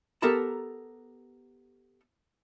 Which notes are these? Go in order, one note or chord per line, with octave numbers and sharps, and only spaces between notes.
B3 G4 A4 A#4 A5 A#5